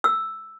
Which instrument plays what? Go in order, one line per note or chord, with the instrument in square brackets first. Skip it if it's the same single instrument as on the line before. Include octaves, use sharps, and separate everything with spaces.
[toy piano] E6